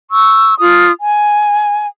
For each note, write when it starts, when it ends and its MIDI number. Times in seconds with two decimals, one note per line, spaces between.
0.11 0.54 85
0.11 0.54 88
0.59 0.90 65
0.59 0.90 87
1.00 1.86 80